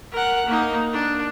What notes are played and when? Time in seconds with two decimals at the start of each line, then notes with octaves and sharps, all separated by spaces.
0.12 A#4 F#5
0.46 A#3 D#4
0.93 D4